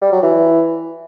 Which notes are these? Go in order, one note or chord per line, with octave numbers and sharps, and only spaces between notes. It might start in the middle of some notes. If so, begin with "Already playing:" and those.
G3
F#3
E3